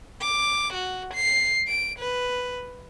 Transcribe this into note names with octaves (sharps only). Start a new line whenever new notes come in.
D6
F#4
C7
D7
B4